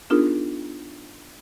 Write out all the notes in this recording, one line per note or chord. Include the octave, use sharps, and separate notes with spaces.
B3 D4 D#4 F4 G#4 A#4